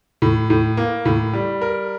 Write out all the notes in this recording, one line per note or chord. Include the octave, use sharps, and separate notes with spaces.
A2
A2
A#3
A2
G3
A#4